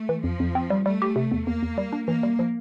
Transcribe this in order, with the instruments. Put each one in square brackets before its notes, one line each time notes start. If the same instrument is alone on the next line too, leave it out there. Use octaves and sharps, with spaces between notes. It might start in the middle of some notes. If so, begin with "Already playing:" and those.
Already playing: [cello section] A3
[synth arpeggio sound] E3
[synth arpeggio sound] F2 [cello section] F3
[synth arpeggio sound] F2
C4
G3
[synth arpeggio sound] G3 [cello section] A3
[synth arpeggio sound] G4
C3
E2
[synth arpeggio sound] E2 [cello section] A#3
[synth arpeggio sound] E2
G3
D4
[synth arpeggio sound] E3 [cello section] A#3
[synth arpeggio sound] G3
F3